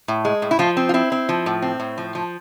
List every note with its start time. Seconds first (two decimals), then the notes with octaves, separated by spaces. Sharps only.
0.08 A2
0.25 G#3
0.42 A2
0.51 E4
0.59 F3 F4
0.77 C4
0.89 F4
0.94 C4 E4
1.12 C4
1.29 F3
1.46 A2
1.62 C4
1.80 A2
1.98 F3
2.15 F3